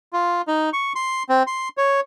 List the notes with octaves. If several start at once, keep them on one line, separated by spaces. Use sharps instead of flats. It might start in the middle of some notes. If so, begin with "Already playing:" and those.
F4
D#4
C#6
C6
C4
C6
C#5